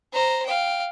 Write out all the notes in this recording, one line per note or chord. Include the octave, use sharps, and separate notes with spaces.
C5 A#5
F5 G5